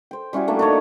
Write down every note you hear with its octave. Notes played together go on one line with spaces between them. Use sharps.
C5 G5
G3 C#4 E4 F#4
A3 A#3 D4
D4 D#4 C#5